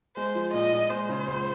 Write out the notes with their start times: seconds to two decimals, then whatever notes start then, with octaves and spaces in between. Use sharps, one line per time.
0.17 G#3 C5
0.35 F3
0.54 A#2 D#5
0.73 A#2
0.90 G#3 C5
1.09 C#3
1.28 C#2